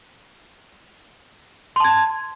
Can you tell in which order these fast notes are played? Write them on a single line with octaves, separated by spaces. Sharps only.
C6 A5 G#6